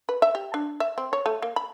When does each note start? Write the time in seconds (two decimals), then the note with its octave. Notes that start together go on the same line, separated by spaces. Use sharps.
0.09 B4
0.22 E5
0.35 G4
0.54 D4
0.80 E5
0.98 C4
1.13 C#5
1.26 A3
1.42 A#3
1.56 B5